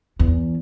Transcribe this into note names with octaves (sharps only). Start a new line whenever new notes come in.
E2